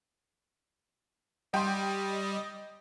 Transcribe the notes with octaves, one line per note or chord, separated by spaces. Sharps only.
G3 D#5 G5 C6